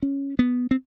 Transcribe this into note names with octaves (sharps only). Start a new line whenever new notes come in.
C#4
B3
C4